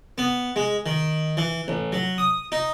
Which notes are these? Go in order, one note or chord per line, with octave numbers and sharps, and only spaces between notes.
B3
G#3
D#3
E3
A1
F#3
D#6
D#4